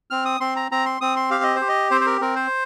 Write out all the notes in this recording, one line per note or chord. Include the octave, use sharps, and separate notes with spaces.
C4 F6
D#6
C4 C6
A#5
C4 A#5
C6
C4 D#6
C6
G4 F5
D#5
C5
G4
D#5
C4 C5
C5
A#4
C4 A#4
C5